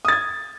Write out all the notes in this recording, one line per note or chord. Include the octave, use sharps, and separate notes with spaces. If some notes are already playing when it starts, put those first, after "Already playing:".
D#6 G#6 A6